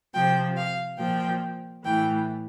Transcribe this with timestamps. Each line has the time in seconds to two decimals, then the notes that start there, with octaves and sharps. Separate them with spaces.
0.14 C3 F3 G5
0.56 F5
0.98 A#2 F3 G5
1.84 A2 E3 G5